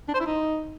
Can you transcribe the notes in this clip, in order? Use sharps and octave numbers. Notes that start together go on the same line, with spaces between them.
D4
C5
E4
D#4